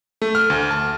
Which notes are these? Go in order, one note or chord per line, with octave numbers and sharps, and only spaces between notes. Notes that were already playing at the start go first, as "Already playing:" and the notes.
A3
F6
D2
A5